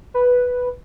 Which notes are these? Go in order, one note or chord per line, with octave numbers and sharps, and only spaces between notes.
B4